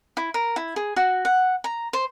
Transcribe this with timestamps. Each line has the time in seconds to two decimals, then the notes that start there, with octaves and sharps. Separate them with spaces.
0.17 E4
0.34 A#4
0.56 E4
0.76 G#4
0.96 F#4
1.25 F#5
1.64 A#5
1.93 C5